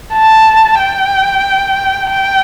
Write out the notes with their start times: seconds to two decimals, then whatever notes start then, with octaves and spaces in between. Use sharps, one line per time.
0.13 A5
0.79 G5
2.10 G5